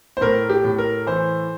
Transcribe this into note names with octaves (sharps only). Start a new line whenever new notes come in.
C5
A2 A#4
G4
A2
A#4
E3 C5